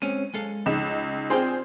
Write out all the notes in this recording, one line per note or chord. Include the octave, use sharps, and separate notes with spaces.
G#3 C4 C#4 D#7
G#3 A4 F5
C#2 D#4 E7
C4 D4 F4 G#4 C5 G5